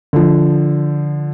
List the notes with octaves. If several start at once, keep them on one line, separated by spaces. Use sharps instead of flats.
D3 F3